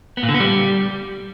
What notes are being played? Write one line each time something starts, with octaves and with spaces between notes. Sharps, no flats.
B3
A#2
D3
B3
G3